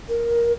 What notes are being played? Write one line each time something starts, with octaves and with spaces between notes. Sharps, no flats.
A#4